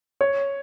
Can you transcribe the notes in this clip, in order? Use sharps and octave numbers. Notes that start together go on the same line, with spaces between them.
C#5